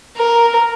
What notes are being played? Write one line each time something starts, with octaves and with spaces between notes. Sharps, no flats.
A#4